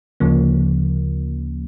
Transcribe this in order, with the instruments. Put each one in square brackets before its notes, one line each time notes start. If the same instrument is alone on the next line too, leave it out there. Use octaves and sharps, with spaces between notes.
[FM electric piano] D2 C#3 F3 A#3